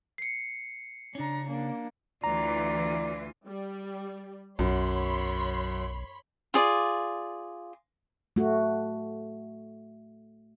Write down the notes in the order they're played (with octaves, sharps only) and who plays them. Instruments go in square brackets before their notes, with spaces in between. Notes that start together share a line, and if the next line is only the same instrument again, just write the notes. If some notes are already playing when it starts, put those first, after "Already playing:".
[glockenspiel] C7 C#7
[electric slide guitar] C#3 C#4 [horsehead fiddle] D4 A#5
[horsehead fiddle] A#3 D4
[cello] D2 F4 [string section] E3 [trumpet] D5 [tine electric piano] A#5
[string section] G3
[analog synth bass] B1 [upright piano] F#2 [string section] C#5 B5 C6
[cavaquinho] F4 G#4 D5
[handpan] A3 F#4